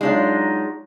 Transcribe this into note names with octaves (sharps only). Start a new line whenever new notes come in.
F#3 G#3 D4 D#4 F4